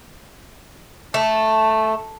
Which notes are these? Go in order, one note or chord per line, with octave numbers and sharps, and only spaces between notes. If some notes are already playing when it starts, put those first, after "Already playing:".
A3 A5